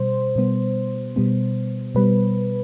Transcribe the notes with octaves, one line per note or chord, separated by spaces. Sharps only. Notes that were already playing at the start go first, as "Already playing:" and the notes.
Already playing: B2 G3 C5
B2 G3 B3
B2 G3 B3
B2 G3 B4